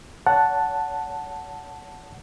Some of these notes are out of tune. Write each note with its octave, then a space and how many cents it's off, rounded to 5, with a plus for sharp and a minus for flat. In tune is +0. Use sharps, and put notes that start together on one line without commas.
C#5 +35 F#5 +0 A5 +0